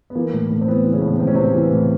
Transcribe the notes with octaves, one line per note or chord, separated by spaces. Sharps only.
B3
E3 A#3
A2
A2
C4
E3 B3
E3
C#3 C#4
A2
A2 C4
C#4
A2 C3 C4
E3
A2